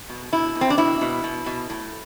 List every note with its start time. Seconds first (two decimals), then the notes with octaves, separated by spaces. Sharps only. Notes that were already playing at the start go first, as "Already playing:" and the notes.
0.09 B2
0.32 B2 E4
0.55 B2
0.61 C4
0.70 D4
0.78 B2 E4
1.01 B2
1.24 B2
1.46 B2
1.70 A2